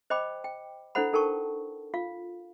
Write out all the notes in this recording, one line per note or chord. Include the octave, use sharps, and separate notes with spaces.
C5 D#5 G5 B5 D6
G5
D4 E4 A4 C5 F#5 B5
D#4 A4 A#4 G5 A5 C#6
F4 F5